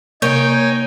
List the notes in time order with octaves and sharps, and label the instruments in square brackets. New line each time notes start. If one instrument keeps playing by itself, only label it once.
[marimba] C3 G6 [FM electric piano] A#3 [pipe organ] D#4 G5 G#5 [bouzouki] C#5